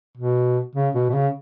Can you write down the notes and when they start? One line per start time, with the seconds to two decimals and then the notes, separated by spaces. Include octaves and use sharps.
0.17 B2
0.75 C#3
0.95 B2
1.09 B2
1.14 C#3